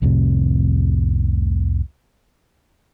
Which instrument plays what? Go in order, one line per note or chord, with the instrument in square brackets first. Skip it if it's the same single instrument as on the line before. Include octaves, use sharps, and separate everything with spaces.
[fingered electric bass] C2 F2 A2 C3